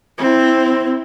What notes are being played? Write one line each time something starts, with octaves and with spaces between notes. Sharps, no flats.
C4 E4